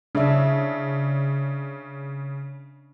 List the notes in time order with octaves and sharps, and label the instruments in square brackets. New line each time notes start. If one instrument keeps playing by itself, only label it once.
[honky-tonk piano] C#3 [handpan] D4 E5